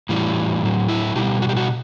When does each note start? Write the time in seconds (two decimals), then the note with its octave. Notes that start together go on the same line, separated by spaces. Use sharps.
0.09 A2 E3 G3
0.62 A2 F#3
0.89 E4
1.16 B2 G3 G4
1.42 F#4
1.49 G4
1.56 F#4